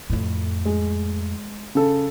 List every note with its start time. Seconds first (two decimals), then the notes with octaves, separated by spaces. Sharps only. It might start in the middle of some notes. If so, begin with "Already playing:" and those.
0.10 F2 A2
0.65 G#3
1.75 C#3 A4